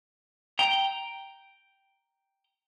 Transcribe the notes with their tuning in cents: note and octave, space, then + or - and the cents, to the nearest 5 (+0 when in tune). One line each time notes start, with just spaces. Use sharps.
G5 +0 A#5 +0